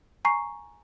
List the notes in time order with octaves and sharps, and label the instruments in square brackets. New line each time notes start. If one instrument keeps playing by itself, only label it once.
[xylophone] G#5 A#5 C#6 C7